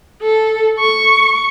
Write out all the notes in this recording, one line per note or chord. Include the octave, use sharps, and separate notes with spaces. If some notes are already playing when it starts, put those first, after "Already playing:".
A4
C#6